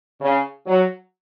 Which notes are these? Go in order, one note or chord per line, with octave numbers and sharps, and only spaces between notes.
C#3
F#3